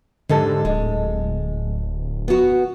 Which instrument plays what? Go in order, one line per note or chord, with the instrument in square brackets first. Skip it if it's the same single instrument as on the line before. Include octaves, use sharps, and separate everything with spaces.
[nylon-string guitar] G#2 G3 A4 [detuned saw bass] D3
[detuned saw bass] D1 [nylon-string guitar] G#3
[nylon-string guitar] B3 F#4